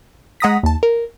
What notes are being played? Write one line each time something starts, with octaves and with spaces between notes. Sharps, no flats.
G#3 F#5 A#5 D#6 A#6 B6
D#2 A5
A#4